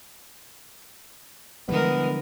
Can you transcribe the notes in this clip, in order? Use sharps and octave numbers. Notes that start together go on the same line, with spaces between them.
D3 E3 F3 G3 G#3 B3 A#4